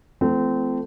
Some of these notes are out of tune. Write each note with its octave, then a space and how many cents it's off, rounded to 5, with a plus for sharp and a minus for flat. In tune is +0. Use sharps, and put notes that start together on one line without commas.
F3 -30 A3 +0 C4 -25